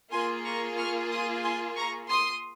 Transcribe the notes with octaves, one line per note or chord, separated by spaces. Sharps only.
A#3 F4 G#4 G#5 C6
A#5 C#6
C#6 F6
C6 D#6
G#5 C6
A#5 C#6
C6 D#6